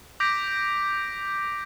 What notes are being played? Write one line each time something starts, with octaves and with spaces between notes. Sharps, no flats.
D6 G6 A#6 B6 D7